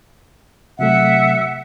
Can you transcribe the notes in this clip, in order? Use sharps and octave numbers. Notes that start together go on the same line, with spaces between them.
C3 F#3 A3 E5 F#5